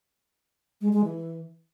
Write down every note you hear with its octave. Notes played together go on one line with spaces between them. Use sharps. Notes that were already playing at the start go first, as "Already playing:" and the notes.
G#3
G#3
E3